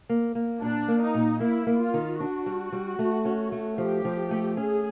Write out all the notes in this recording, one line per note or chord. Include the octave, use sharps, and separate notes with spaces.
A#3
A#3
A#2 D4
A#3
D#4
A#2
A#3 E4
A#3
F4
D#3
D4 F#4
G3
G3
A3
C#4
A3
F3 G4
F3
A3
C#4 G#4